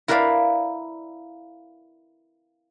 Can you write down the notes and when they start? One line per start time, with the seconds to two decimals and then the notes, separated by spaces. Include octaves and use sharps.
0.08 E4 A#4 B4 D5 F5